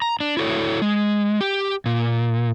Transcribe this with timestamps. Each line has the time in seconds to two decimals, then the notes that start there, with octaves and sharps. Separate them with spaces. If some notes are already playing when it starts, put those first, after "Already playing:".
0.02 A#5
0.20 D4
0.37 E4 F#4 A4 C#5
0.82 G#3
1.41 G4
1.86 A#2